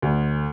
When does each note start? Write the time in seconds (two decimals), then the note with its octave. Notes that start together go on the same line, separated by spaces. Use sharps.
0.02 D2